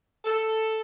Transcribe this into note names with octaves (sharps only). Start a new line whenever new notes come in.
A4